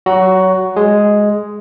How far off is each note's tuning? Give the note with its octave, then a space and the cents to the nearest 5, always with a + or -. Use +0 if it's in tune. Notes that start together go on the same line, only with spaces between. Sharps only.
F#3 +25 F#4 +10
G#3 +0 G#4 +0